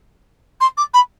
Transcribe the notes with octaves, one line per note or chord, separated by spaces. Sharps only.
C6
D6
B5